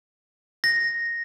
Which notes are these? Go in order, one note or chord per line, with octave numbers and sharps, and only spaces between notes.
A#6